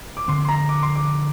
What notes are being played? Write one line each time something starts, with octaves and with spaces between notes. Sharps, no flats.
D6
D3 F3 C4 C6
C6
A#5
D6
C6
D6